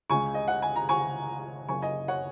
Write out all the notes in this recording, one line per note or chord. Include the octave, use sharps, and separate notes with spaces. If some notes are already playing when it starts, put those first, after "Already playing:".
C#2 C#3 G#3 G#5 C#6
D#5
F#5
G#5
A#5
G#5 C#6
F#1 F#2 C#3 G#5 C#6
D#5 G#5
C#5 F#5